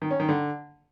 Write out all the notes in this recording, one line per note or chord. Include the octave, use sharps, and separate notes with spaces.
D#3
C#4
D#3
D3